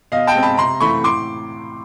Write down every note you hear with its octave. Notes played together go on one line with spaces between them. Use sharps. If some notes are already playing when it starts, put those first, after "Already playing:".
B2 D#5 F5
G5 A5
G#3 C4
A5 B5
C3 A#5 C6
E3 A3 C4 B5 C#6
A2 C6 D6